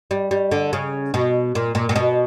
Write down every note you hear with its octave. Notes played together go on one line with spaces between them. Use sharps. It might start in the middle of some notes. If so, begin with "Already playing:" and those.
G3
G3
D3
C#3
B2
A#2
A#2
A#2
B2